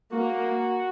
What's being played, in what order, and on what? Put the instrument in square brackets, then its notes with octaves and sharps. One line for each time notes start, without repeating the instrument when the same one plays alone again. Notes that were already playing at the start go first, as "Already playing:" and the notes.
[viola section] A#3 [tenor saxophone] F#4